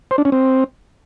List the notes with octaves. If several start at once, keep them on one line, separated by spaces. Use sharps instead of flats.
C5
D4
C#4
C4